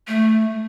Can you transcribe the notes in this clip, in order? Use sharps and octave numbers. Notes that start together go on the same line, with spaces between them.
A3